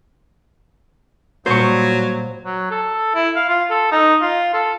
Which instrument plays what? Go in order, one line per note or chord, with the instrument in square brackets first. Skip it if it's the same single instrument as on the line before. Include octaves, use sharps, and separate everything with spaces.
[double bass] A#2 G3 [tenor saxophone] F#3 [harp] C5 C#6
[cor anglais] F#3
A4
E4
F5
F4
A4
D#4
F4
A4